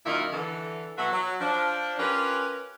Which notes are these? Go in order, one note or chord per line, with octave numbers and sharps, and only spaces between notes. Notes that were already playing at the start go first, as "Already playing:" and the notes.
F#2 A#2 D#3 E4 F4 D5
D3 E3 A4
B2 F#3 F#4 B4 E5
F#3
F3 D4
C#4 F4 G4 A#4 B4